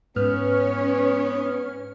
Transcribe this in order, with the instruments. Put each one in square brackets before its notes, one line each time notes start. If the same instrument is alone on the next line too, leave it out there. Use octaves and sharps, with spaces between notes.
[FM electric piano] G#2 F6 [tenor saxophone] B3 [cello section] C#4 C#5 [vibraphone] B4